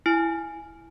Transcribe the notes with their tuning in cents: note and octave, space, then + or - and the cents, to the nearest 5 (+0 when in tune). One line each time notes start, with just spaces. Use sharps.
E4 +5 G#5 +0